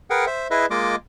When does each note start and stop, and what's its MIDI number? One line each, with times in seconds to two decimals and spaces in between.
0.10 0.25 68
0.10 0.25 70
0.10 0.25 71
0.10 0.25 78
0.10 0.25 79
0.26 0.48 72
0.26 0.48 76
0.51 0.66 64
0.51 0.66 68
0.51 0.66 71
0.51 0.66 75
0.51 0.66 76
0.70 0.95 56
0.70 0.95 58
0.70 0.95 65
0.70 0.95 75
0.70 0.95 86